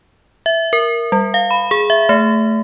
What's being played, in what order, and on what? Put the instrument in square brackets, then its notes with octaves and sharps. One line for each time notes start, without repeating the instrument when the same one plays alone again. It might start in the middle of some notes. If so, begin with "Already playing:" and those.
[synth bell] E5
A#4
G3
F5
B5
G#4
E5
A3